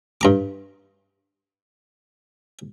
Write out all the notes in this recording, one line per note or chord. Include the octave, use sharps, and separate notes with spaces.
G2 A#5 D6